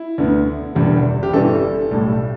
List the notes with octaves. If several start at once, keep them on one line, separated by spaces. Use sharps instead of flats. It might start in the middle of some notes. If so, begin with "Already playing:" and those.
Already playing: E4
D2 D3 B3
E1 E2 D3 G3
G4
G1 G2 E3 G3 A4
B1 A2 G3